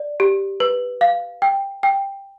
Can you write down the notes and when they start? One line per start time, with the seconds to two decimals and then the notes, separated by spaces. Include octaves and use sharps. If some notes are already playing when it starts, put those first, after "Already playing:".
Already playing: D5
0.20 G4
0.60 B4
1.01 F5
1.42 G5
1.83 G5